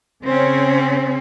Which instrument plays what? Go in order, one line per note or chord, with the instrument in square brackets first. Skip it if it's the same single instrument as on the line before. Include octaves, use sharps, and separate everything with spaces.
[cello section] C#3 C4 C#4